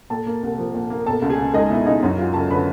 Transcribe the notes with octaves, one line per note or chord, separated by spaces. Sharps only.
A#2 A4 A5
A#3
C2
F3
A#2
A#3
B2 A4 A5
C#2
G#4 G#5
C#2
G#3 D#4 D#5
B2 E4 E5
C#2 D#4 D#5
F#2
F#3 F4 F5
F#1 A4 A5
D3 B4 B5